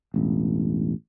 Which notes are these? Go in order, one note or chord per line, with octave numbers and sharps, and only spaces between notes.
E1 A1